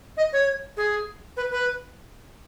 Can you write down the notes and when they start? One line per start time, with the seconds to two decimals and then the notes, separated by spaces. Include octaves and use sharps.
0.17 D#5
0.33 C#5
0.77 G#4
1.37 B4
1.51 B4